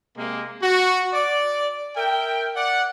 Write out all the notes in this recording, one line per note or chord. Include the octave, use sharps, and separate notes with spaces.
C3 G#3 A#3
F#4
D5
A#4 E5 G5
D5 F#5